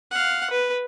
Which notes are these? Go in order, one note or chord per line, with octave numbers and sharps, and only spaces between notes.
F5 F#5
B4